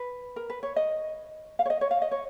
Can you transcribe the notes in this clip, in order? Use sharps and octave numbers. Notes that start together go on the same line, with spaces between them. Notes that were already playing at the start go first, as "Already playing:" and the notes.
Already playing: B4
A#4
B4
C#5
D#5
F5
C#5
D#5
C#5
F5
D#5
C#5